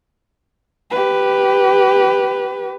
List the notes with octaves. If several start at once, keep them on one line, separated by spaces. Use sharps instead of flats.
G4 B4